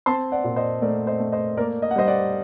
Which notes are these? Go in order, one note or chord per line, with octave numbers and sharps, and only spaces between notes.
C4 A5 C6
D5 F#5
A#2
C5 D#5
A3 A#4 D5
C5 D#5
A3
C5 D#5
A#3 A#4 D5
D#5
F#5
G3 C5 D#5
D5 F#5